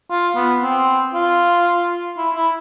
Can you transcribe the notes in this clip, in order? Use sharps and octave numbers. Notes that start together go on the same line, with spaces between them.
F4
B3
C4
F4
E4
E4